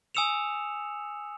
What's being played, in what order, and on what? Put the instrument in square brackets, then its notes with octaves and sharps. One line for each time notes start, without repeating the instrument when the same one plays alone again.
[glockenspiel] G#5 D#6 E6 C#7 E7 F7